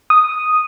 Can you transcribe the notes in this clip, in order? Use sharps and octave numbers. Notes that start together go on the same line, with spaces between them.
D#6